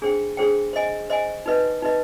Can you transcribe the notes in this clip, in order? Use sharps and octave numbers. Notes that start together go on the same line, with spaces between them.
D4 G#4 C5 G5
D4 G#4 C5 G5
C5 D#5 G#5
C5 D#5 G#5
D#4 B4 D#5
D#4 B4 D#5